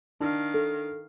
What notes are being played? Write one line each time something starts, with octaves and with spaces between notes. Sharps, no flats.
D#3 D4 F5
A4